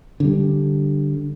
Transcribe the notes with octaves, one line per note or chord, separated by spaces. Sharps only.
D3 G3